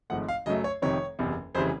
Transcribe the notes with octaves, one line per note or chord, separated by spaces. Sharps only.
G#1 G#2 F3 A3 F#5
F5
F#2 C#3 F#3 A3 D#5
C#5
F1 F2 C3 D#3 C#5
F#1 E2 C3
F1 C#3 E3 G3 C5